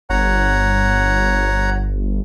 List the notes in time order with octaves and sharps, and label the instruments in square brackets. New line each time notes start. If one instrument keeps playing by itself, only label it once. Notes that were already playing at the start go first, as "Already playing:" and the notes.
[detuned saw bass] G1 [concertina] C#5 F#5 A#5